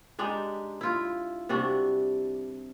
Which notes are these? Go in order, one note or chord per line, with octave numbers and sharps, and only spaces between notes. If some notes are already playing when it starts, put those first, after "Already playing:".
G#3 D4 D#4 G4
E4 F4
C3 G3 D4 F#4